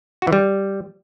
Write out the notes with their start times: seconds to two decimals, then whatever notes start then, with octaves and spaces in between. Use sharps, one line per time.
0.22 F#4
0.27 E3
0.33 G3